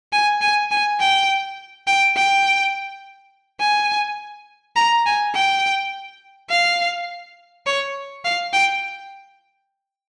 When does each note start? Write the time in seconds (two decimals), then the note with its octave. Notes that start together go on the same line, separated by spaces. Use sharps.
0.12 G#5
0.41 G#5
0.71 G#5
1.00 G5
1.87 G5
2.16 G5
3.60 G#5
4.76 A#5
5.06 G#5
5.34 G5
6.50 F5
7.66 C#5
8.25 F5
8.53 G5